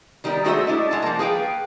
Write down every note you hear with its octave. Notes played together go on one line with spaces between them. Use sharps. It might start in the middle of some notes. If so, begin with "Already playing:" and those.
D#3 G3 B3 A#4
G#3 A3 F#4 G#4 C5 E5
D4 E4 D#5
G#3 F#5 A5
F3 A#3
G#4 B4 F5 G5